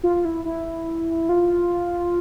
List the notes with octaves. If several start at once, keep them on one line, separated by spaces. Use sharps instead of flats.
F4
E4
E4
F4